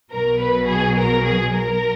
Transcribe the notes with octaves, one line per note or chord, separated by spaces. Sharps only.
B1 B2 F#3 A#4
B4
G#4
A#4
G#4
A#4